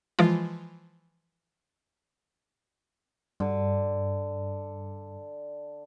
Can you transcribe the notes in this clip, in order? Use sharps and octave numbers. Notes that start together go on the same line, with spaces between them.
E3 F3 G#3 F4
G2 D3